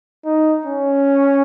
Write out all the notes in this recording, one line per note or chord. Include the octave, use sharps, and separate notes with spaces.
D#4
C#4